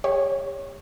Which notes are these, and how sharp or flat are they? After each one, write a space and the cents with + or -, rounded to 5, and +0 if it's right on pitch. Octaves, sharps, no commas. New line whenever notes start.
G4 +35 C#5 +0